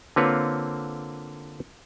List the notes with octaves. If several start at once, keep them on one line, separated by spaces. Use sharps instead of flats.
D3 A#3 C4 F4 B4 C#5